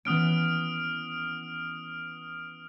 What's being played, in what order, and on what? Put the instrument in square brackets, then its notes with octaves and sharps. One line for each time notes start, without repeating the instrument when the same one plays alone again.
[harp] E3 B3 C#4 [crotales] D#6 F6 D7